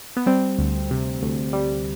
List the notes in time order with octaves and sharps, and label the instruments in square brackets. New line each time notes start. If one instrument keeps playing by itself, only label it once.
[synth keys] B3
G3 C4
D2
C3
D2
G3